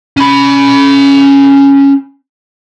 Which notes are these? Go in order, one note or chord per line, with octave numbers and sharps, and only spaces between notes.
C#4 B5